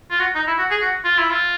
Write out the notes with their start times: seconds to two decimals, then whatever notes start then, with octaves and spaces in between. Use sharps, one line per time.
0.11 F4
0.19 F#4
0.35 D#4
0.47 E4
0.58 F#4
0.71 G#4
0.82 F#4
1.05 F4
1.18 E4
1.31 F4